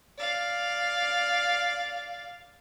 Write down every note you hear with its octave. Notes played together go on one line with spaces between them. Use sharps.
D5 F5